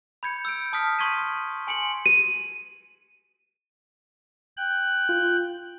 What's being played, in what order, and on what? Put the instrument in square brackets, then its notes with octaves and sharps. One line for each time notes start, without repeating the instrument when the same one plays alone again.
[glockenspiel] B5 G6 G#6 C#7
E6 G6 D7
A5 D#6 F6 B6
C6 C#6 G#6 B6 D#7
G#5 C6 C#7 D7 F#7
[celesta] D#7
[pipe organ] G5 F#6
[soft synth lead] F4